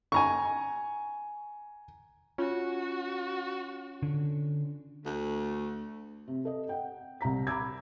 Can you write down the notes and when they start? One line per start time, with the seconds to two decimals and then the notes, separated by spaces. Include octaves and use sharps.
0.12 G#5 A#5 C#6
2.38 C#4 F4 F#4
4.03 D3
5.05 D2 A3
6.28 C3
6.45 A4 D#5
6.69 F#5 G5
7.21 C2 C3 A#5 B6
7.47 A#5 B5 D6 E6 G#6